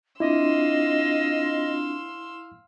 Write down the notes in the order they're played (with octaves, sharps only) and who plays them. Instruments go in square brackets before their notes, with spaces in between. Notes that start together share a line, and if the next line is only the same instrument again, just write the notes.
[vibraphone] C4 D4 F4 [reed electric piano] E4 [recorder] D#5 [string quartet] F5 C6 E6